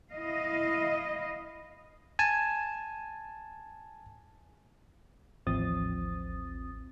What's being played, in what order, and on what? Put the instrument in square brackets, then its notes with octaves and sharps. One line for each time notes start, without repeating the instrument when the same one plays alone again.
[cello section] E4 D#5 F5
[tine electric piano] G#5 A5
[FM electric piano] A1 D#2 F3 C4 D#6 A6